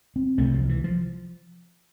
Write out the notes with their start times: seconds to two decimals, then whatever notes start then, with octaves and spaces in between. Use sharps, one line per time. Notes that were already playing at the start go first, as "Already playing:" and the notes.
0.16 C4
0.38 C2 C3 A3
0.54 F3
0.69 E3
0.84 F3